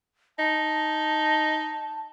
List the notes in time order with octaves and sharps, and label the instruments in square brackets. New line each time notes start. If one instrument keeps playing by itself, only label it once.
[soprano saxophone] D#4 [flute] A5